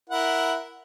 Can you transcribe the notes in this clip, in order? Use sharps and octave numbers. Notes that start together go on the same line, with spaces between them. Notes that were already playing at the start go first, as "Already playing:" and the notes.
E4 A#4 F#5